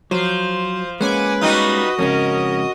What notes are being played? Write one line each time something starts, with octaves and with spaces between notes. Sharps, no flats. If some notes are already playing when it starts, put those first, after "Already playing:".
F3 F#3 C5
G#3 A#3 C#4 B4 F#5 G#5 D6
G3 D#4 F4 F#4 D#5 D#6
F2 G#2 C#3 C#4 A#4